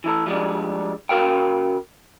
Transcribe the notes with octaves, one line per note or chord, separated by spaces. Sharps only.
E3 E4 A4
F3 G3 G#3 D4
C#3 F#4 A#4 F5 G5